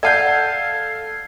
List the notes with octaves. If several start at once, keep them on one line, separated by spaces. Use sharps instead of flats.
A4 D5 F5 F#5 A5 G6 G#6 C7